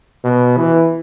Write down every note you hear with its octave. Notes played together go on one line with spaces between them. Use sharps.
B2
E3